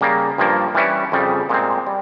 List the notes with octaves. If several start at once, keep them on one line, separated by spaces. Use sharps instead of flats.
C#3 G3 A#3
G2 F3 A#3
E3 G3 C#4 E4
F2 C#3 G3
A#2 G#3 C4
G3